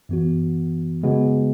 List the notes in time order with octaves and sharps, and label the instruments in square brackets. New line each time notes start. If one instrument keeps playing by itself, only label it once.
[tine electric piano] F#2 E3 B3 F#4
C#3 G#3 B3 F#4